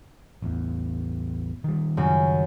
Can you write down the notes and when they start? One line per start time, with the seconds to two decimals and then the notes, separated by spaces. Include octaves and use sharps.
0.42 A1 E2
1.64 D#3 G3
1.97 F#2 C#3